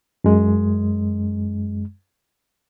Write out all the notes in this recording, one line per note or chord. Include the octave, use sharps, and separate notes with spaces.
F#2 G#3